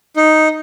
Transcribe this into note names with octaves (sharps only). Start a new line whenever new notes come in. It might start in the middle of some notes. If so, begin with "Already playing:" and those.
D#4